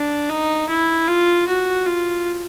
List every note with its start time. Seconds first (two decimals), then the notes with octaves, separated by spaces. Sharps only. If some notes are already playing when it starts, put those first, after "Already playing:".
Already playing: D4
0.30 D#4
0.69 E4
1.08 F4
1.47 F#4
1.86 F4